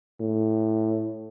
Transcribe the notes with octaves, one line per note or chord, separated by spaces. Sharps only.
A2